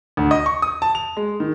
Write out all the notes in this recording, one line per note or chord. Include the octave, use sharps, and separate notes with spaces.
D2
D#5
C#6
D#6
A5
F7
G#3
D#3